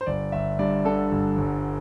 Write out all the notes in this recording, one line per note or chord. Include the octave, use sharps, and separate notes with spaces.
C5
G1 D5
G1 E5
G2 D5
D3 A4
G1
G1